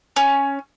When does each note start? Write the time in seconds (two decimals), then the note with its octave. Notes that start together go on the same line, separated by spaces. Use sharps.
0.16 C#4